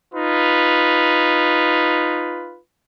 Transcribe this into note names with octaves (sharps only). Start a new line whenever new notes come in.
D#4 F4 B4